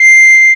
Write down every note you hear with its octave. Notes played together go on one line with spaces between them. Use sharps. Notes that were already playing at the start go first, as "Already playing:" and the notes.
Already playing: C7